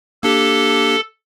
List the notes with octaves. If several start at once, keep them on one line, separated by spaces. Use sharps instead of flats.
A#3 D4 G4 A4